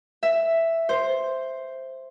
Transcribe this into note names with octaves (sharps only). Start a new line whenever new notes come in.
E5
C5